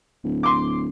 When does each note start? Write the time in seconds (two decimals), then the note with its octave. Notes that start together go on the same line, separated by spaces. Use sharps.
0.24 D1
0.43 C6 D6